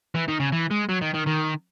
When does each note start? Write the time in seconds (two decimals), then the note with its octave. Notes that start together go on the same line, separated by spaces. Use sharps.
0.15 E3
0.28 D#3
0.40 C#3
0.52 E3
0.71 G#3
0.89 F#3
1.02 D#3
1.14 D#3
1.27 D#3